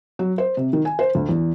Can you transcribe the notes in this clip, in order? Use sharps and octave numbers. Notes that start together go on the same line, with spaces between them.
F#3
C5
C3
D#3
G#5
C5
D2
E2